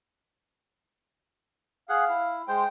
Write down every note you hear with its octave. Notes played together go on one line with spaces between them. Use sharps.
G#4 F5 F#5
E4
G#3 C5 G5